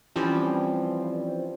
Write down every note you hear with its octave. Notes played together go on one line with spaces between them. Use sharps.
E3 F3 G3 C4 C#4